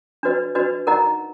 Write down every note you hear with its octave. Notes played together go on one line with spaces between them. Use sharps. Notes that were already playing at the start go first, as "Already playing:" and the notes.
D4 F#4 B4 D#5
D4 F#4 B4 D#5
D#4 A#4 D#5 F#5 A#5